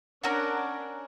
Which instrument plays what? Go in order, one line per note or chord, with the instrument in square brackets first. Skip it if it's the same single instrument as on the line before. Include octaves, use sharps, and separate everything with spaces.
[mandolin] C#4 A#4 F#5 [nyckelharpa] D4